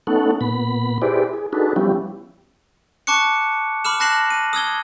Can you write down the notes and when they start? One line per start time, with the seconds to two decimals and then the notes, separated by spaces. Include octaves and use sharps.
0.07 A3 B3 C#4 D#4 A4 F#5
0.41 A#2 B3 B5
1.02 E4 G4 G#4 B4 C5 D5
1.33 G#4
1.53 D4 D#4 F#4 G#4 A4 B4
1.76 F3 G3 B3 C#4 E4 G4
3.07 A5 C#6 D6 F#6 C#7
3.84 B5 D6 F6 E7
4.00 A5 F#6 A#6 C7 E7 F#7
4.30 D#7
4.53 D#6 E6 G#6 G7